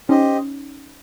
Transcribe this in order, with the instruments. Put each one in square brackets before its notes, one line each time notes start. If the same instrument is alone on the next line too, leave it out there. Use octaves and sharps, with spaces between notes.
[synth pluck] C#4 D#4 [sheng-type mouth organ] G4 C5 D#5